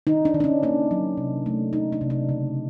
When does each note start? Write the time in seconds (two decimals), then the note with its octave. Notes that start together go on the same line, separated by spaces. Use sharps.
0.07 D#3 D#4
0.25 D4
0.34 D#3
0.40 D4
0.44 C#4
0.63 A#3 D4
0.91 F#3
1.17 C3
1.46 A3
1.73 C3 D#4
1.92 D4
2.01 C3
2.10 D4
2.29 C#3